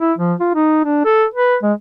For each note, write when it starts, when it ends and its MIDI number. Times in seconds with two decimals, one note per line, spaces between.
0.01 0.13 64
0.18 0.34 53
0.40 0.50 65
0.55 0.85 63
0.85 1.04 62
1.05 1.25 69
1.34 1.56 71
1.63 1.73 56